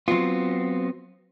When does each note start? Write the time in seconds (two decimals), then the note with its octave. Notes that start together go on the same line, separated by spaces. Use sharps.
0.08 F#3 B3 C4 F4